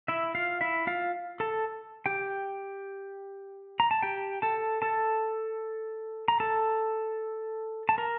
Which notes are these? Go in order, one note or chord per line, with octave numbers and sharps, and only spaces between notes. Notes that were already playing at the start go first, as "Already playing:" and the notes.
E4 E5
F4 F5
E4 E5
F4 F5
A4 A5
G4 G5
A#5
A5
G4 G5
A4 A5
A4 A5
A#5
A4 A5
A5
A#4 A#5